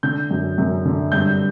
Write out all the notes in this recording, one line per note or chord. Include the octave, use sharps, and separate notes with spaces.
D3 G6
F#2
F#2
D3
G2 G6